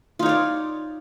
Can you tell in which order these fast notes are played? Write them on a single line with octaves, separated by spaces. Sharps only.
F4 D#4 C#5 D5